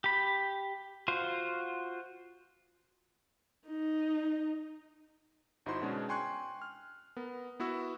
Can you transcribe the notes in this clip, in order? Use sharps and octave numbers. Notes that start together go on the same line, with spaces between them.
G4 B5
F4 F#4 C5
D#4
G1 D#4 E4 F#4 C5 C6
B2 G#3 C#4 D4
G5 G#5 C6 C#6 F#6 G#6
F6
B3 A#4
B3 E4 F#4 E6